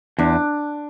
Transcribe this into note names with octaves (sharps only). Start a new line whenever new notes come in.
E2 D4